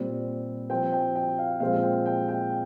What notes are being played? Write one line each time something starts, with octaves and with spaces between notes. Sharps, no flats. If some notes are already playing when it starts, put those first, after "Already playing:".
Already playing: A#2 G3 C4
F3 C4 G5
G5
G5
F5
A#2 F3 G#3 C4 F5
G5
G5
G5